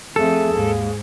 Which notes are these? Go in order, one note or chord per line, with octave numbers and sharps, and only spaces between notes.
F2 A3 G#4 A4
D#2 G#2